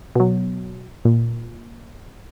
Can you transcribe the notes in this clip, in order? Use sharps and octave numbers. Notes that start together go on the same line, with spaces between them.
B2 F#3
A#2